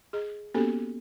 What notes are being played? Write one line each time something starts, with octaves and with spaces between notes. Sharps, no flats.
G#4 D#5
A#3 B3 C#4 F#4 G4 A4